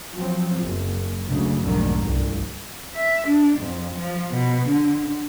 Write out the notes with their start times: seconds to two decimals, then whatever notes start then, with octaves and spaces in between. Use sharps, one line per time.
0.13 F3 F#3 C4
0.61 F#1
1.29 F#1 D2 C#3
1.62 B1 F2 G#2 D3 D#3 A3
2.01 G1 C2
2.96 E5
3.28 D4
3.60 F2
3.99 F3
4.31 B2
4.69 D3